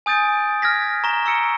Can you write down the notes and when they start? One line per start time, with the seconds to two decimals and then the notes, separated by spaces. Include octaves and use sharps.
0.06 G#5 D#6 G6 A6 D7
0.62 F6 G#6 A#6 B6
1.04 A#5 C#6 A#6 E7 G7
1.26 C#6 E6 C#7 D7